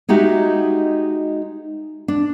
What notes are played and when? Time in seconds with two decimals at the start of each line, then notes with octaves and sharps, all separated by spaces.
0.09 G#3 D#4 F#4 G4 E5
2.08 D4